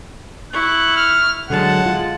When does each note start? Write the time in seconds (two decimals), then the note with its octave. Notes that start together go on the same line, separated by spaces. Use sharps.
0.53 E4 C#6 F#6
0.97 F6
1.50 D3 F#3 G#3 F#5 A5
1.86 F4